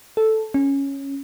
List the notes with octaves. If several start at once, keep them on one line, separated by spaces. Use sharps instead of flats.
A4
C#4